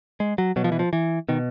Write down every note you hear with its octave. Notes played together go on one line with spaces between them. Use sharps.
G#3
F#3
B2 F#3
F3
E3
F3
E3
B2 D#3